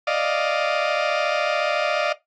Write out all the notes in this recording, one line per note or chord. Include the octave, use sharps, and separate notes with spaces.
D5 D#5 F5